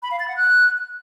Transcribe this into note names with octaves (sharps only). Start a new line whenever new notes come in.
B5
F5
A6
F#5
F#6